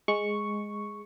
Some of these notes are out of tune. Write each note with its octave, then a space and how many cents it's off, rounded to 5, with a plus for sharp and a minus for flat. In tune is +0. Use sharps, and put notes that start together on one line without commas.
G#3 +0 C#6 +0